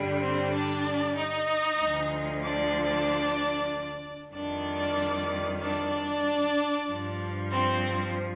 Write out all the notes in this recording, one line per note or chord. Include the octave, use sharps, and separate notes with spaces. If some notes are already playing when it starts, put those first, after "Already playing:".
Already playing: G2 D3 G3
C4 C5
D4 D5
D#4 D#5
D2 D3 F3
D4 D5
F2 D#3 G3 D4 D5
D4 D5
G2 F3
C4 C5